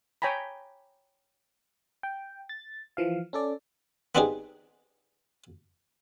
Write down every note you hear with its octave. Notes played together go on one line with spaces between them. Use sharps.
C#5 G5 G#5 A#5 B5
G5
A6
E3 F3 F5
C#4 A4 D5
B3 C4 D4 D#4 G4 G#4